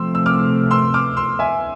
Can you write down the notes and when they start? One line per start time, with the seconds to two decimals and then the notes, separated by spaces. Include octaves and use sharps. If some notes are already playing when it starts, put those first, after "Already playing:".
Already playing: C3 F3 A3 C4 C6 E6
0.15 E6
0.26 D6 F6
0.71 C6 E6
0.94 D6 F6
1.17 C6 E6
1.39 E5 G#5